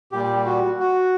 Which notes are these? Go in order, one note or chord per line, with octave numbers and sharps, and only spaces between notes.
A#2 G3 G4
F#4
F#4